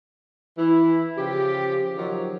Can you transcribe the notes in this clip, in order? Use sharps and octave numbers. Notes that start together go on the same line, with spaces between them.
E3 E4
C#3 F3 G4
D#3 F3 F#3